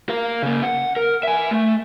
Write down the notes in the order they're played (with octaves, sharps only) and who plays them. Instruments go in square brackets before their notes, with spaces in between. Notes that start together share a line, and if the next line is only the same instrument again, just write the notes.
[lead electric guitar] A#4 F5
C#3 A#3
F#5
A#4
E5 G#5
A3